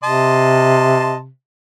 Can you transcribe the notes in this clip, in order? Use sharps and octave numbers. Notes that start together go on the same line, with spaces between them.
C3 D#5 A5 C6